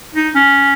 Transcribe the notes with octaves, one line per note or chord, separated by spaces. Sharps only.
D#4
C#4